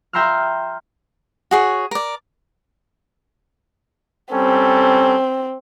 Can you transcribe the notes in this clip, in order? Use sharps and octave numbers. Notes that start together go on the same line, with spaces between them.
E5 G5 A#5 C6 E6 F6
F#4 G#4 C#5
A#4 D5
G3 C4 C#4 A4